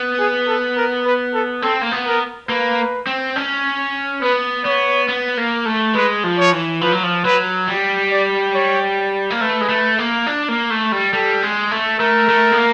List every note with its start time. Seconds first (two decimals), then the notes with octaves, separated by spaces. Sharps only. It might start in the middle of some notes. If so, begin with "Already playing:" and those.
Already playing: B3
0.19 G#4
0.47 A4
0.77 A#4
1.05 B4
1.34 A4
1.62 C4 A4
1.82 A#3
1.92 B3
2.06 A#4
2.49 A#3 B4
3.07 C4
3.36 C#4
4.22 B3 B4
4.65 B3 C#5
5.08 B3
5.37 A#3
5.66 A3
5.95 G#3 B4
6.24 F3
6.39 C#5
6.52 E3
6.81 F3 B4
6.92 F#3
7.03 F3
7.25 F#3 B4
7.68 G3
8.10 D5
8.54 C#5
9.30 A#3
9.40 A3 B4
9.61 G#3
9.69 A3
9.99 A#3
10.27 D4
10.49 A#3
10.70 A3
10.92 G3
11.13 G3 A4
11.42 G#3
11.71 A3
11.99 A3 A#4
12.29 A3
12.52 B3
12.58 A#3